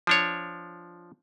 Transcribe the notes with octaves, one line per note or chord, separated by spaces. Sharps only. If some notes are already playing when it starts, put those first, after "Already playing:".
F3 D4 C#5